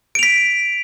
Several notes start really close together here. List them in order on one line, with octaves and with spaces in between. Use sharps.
D7 F7 B6